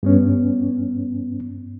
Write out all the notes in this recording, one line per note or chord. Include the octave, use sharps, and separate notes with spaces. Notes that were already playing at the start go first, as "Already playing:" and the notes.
G2 B3 C#4